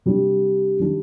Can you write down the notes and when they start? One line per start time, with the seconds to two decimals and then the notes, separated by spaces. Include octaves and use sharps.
0.06 C3 G3 D4
0.79 D#3 G3 D4